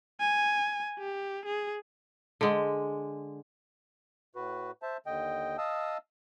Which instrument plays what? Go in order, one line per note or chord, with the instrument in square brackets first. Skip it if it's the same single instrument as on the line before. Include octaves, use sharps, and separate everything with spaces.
[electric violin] G#5
G4
G#4
[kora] D3 G#3
[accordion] A2 F#4 B4
C5 E5 A5
D#2 D3 D#5 G5
D#5 F5 A5 D#6 E6